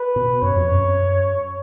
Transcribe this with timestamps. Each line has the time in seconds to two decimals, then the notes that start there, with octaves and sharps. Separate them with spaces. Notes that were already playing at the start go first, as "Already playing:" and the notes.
Already playing: B4
0.16 B2
0.42 F#2 C#5
0.56 F2
0.70 F#2